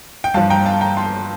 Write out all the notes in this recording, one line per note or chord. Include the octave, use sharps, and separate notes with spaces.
G5
G2 F3 F5 A5
G5 A#5
F5 A5
G5 A#5
A5 C6